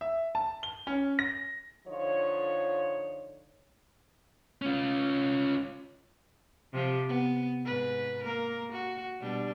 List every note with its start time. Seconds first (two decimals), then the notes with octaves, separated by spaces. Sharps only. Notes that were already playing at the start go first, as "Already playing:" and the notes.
0.01 E5
0.35 A5
0.63 G7
0.87 C#4
1.19 A#6
1.87 D3 F3 D#4 F4 C#5
4.62 C#4 F4
6.73 C3 F3 G4
7.09 B3
7.65 G#2 B4
8.23 A#3 A#4
8.72 F#4
9.21 B2 G3 D4